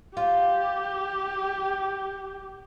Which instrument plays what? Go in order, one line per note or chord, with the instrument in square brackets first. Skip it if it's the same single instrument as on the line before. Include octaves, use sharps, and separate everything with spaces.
[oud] F4 [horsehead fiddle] G4